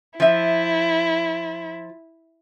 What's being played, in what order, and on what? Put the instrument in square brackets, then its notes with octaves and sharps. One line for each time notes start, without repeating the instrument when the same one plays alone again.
[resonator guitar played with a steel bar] F3 E5 [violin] E4